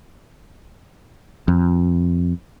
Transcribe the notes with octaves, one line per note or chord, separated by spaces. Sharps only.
F2